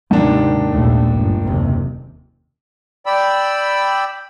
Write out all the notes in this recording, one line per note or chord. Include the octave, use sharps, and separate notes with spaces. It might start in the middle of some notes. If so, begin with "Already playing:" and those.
D#2 G#2 C3 D#3 D4
A#1 D#2 A3
G1
F#1 D#2 C3
D5 G5 B5 E6